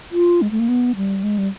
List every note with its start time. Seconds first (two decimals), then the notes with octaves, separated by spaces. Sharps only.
0.12 F4
0.42 G#3
0.51 A3
0.60 A#3
0.68 B3
0.96 G3
1.24 G#3
1.38 G3